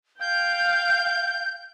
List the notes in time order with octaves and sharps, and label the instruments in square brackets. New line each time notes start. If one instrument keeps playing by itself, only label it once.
[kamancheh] F5 G5 [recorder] G6